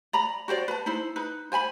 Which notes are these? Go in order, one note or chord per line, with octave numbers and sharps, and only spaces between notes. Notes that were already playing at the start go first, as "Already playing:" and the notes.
D5 A#5 B5
F#4 G4 C5 D5
B4 A5
D#4 E4 C5
D#4 B4
C5 G#5 A5 B5